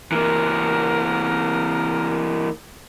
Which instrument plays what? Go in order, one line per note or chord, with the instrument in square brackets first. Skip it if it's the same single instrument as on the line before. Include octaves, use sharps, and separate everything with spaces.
[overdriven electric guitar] E3 A#3 [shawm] A#4